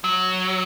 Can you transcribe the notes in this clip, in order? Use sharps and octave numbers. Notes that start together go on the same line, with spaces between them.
F#3